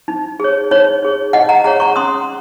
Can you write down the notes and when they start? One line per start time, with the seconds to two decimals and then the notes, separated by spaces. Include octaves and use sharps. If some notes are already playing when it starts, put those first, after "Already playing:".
0.08 D#4
0.40 G#4 C#5
0.71 D#4 C#5
1.03 G#4 C#5
1.33 D#4 D#5 F#5
1.49 F#5 A#5
1.64 G#4 C#5 F#5 A#5
1.80 A#5 C#6
1.96 C#4 C6 D#6